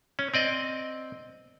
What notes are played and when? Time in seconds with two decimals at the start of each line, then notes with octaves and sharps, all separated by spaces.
0.19 C#4
0.34 C4 D5 D#5